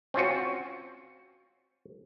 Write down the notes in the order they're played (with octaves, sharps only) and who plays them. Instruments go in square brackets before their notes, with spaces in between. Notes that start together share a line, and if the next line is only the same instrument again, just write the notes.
[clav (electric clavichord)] C4 C#4 F4 F#4